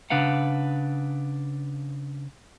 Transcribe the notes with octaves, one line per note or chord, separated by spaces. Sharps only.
C#3 D4 B4 F5 F#5